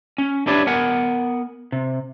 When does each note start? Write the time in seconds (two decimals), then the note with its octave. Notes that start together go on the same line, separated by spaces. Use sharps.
0.18 C#4
0.47 D4 E4 G4 B4 C#5 D5
0.67 B3 A#4 F#5 G#5
1.72 C3